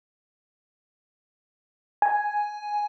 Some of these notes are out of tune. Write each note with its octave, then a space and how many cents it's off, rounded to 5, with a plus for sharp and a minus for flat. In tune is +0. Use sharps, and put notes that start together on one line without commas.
G#5 +5